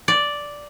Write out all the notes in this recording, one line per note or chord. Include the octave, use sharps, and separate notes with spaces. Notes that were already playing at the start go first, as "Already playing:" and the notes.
D5